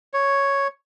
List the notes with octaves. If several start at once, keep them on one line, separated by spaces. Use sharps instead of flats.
C#5